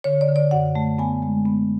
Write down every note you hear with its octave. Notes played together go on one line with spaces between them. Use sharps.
D3 C#5
D5
D3
D5
F#2 F#5
A3
B3 G#5
G#3
B3